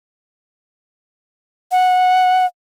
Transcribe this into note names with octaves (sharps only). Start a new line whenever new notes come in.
F#5